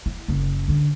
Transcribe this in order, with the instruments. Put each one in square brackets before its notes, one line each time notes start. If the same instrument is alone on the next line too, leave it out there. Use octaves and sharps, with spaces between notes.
[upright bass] E4
F#1 C#4
D3 D4